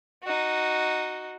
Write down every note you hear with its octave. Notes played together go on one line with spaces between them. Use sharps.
D#4 F#4